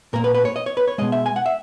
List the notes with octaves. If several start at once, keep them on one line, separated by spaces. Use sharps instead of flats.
A#2 A#3 A#4
B4
B4
C#5
D#5
C#5
B4
C#5
B2 G#3 D#5
E5
G#5
F#5
E5